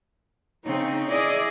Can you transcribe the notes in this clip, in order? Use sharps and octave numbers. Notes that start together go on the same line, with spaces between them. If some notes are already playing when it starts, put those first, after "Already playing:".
C#3 C4 D#4
E4 G#4 D5 D#5